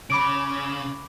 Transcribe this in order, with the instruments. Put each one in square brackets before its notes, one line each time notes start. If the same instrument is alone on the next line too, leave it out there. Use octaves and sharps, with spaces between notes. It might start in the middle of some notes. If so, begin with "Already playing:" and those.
[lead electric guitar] C#3 [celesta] B5 D6 D7